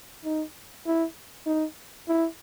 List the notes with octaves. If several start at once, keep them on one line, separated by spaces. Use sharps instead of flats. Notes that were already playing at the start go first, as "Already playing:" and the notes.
D#4
E4
D#4
E4